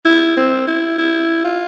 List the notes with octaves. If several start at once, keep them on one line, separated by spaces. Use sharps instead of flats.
E4
C4
E4
E4
F4